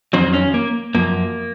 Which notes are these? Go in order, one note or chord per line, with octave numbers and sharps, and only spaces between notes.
F2 D#3 F#3 C4
C#4
A#3
F#2 F3 A#3